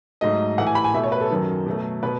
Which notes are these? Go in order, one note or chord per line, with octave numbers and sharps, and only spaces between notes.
G#2 F#3 A3 D#5
A2 E3 A3 F#5
G#5
B5
G#5
B2 A3 E5
C#5
B4
A4
F#2 D#3 F#3
B2 F#3 A3
B2 B4